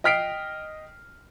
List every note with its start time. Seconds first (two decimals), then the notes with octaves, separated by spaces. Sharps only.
0.04 D#5 G5 F6 B6 C7 D7